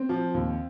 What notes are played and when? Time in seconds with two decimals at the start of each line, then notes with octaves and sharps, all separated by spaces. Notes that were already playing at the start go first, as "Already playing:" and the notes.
Already playing: C4
0.09 F3
0.34 D#2